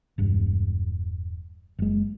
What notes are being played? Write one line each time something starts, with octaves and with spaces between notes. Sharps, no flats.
E1 G2
F#1 G#3